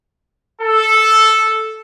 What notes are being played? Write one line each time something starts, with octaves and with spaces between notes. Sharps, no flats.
A4